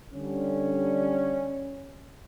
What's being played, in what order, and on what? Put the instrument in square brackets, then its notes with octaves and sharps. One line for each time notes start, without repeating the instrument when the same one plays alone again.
[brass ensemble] D3 G3 [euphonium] C#4